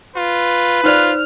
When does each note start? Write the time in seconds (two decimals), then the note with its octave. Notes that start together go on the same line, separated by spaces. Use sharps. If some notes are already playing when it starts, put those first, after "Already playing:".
0.16 F4 B4
0.84 D#4 F4 C5 D5 F6